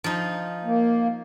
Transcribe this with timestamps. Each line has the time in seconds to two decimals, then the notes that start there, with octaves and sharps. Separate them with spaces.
0.04 F3 D#4
0.65 A#3